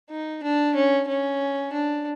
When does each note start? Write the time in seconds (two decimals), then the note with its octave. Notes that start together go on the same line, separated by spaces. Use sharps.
0.10 D#4
0.43 D4
0.75 C#4
1.08 C#4
1.73 D4